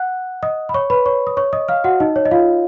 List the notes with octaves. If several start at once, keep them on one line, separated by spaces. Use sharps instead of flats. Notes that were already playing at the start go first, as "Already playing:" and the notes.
Already playing: F#5 F#6
D#5 D#6
B5
C#5 C#6
B4 B5
C#5 C#6
D#6
C#5 C#6
D#5 D#6
F5 F6
F#4 F#5
D#4 D#5
C#5
D#5
F4 F5